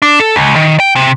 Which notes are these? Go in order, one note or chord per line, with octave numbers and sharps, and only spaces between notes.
D4
A4
C#2
D#3
G5
C3